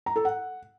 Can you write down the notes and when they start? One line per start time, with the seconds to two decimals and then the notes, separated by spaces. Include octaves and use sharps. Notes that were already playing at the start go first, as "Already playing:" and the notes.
0.06 A#5
0.16 A4
0.25 F#5